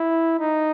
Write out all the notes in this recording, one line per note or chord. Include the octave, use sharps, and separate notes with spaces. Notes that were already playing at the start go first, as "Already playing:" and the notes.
Already playing: E4
D#4